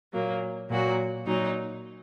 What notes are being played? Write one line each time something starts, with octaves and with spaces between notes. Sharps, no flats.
A#2 F#3 A#3
A#2 F#3 A#3 F#4
A#2 F#3 D#4